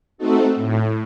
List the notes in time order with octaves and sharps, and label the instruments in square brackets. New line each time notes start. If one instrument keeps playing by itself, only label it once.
[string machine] A3 C4 D#4 F#4 A4
[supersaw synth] A2